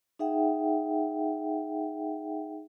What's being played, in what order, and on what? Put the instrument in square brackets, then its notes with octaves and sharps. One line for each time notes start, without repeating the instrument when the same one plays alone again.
[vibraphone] D#4 G#4 E5 F#5 G5